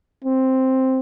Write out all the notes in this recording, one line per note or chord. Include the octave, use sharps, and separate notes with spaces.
C4